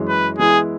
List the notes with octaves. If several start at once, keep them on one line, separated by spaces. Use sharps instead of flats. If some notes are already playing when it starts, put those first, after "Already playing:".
Already playing: F#2 E3 G#3 C#4
B4
E3 G#3 B3 E4 G#4